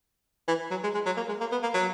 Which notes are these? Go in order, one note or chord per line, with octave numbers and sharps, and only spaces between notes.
E3
F#3
G#3
G#3
F#3
A#3
G#3
A#3
B3
A#3
F#3